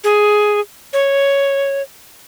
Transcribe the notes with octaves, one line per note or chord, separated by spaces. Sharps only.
G#4
C#5